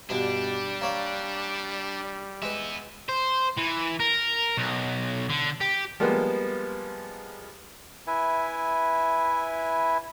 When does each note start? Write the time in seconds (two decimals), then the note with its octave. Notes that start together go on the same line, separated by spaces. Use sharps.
0.10 G2 B2 G3 D4
0.81 A#3 C#5 F5
2.42 G#3 B3 B4 E5
3.09 C5
3.57 E3
4.00 A#4
4.58 B1
5.30 D3
5.61 G4
6.00 F3 G3 G#3 A#3 B3
8.07 E4 B4 E5 G#5